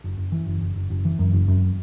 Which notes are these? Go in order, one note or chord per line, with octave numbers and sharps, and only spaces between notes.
F#1
F#1
E3
F#1
F#1
F#1
F#1
E3
F#2
F#1
F#2